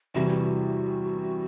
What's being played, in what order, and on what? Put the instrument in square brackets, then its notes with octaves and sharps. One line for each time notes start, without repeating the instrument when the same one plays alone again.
[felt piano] E2 C3 E3 G3 [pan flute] F#4